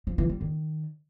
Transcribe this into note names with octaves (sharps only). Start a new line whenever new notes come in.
F3
E3
G3
D#3